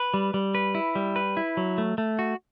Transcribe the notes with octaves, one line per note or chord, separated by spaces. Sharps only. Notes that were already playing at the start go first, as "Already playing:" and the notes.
Already playing: B4
G3
G3
B4
E4
G3
B4
E4
F#3
A3
A3
F#4